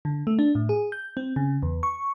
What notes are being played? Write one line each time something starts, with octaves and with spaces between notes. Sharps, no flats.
D3
A3
D4
A2
G#4
G6
C4
C#3
E2
C#6